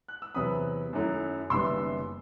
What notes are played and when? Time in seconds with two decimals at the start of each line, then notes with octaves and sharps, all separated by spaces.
0.08 F#6
0.22 E6
0.35 E2 C3 F#3 B3 B5 D#6
0.93 F#2 D#3 F#3 A3 E4
1.50 F#1 F#2 D#3 G3 B3 C6 E6